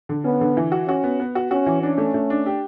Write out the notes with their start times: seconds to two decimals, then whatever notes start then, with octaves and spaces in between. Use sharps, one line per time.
0.09 D3
0.24 B3 C#4
0.41 D3
0.57 E3
0.72 F#4
0.88 C#4 F#4
1.04 B3
1.20 B3
1.35 F#4
1.51 C#4 F#4
1.66 E3
1.83 C#4 D4
1.98 A3
2.14 A3
2.30 D4
2.46 G4